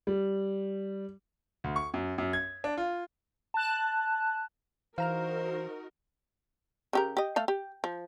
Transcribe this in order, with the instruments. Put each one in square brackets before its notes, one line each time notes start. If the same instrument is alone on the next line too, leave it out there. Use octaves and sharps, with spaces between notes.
[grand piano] G3
D2
C#6
F#2
F#2
G#6
D4
F4
[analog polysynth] A5 F#6
[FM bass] E3 [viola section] D#4 F#4 A#4 [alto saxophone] C5 [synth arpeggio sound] F5 A#5 F6
[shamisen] C#3 G4 A#4
G4 D#5
A3 A4 F5
G4
F3